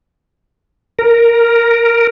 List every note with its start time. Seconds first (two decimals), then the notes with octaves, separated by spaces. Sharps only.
0.99 A#4